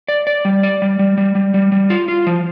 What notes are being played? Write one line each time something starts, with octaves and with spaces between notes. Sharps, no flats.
D5
D5
G3
D5
G3
G3
G3
G3
G3
G3
F4
F4
F3